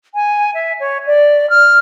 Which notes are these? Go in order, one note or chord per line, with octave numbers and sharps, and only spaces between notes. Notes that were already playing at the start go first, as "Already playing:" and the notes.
G#5
E5
C#5
D5
F6